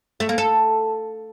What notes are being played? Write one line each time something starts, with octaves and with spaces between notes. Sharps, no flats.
A3
A#3
A4